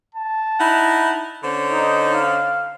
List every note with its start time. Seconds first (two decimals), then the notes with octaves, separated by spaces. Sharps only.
0.15 A5
0.60 D#4 E4 F#5
1.43 D3 C#4 C5
1.72 D#4
2.14 F5